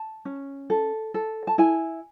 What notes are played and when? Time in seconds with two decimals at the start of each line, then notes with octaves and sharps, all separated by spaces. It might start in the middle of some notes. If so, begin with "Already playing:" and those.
Already playing: A5
0.25 C#4
0.70 A4
1.14 A4
1.47 A5
1.58 E4 G#5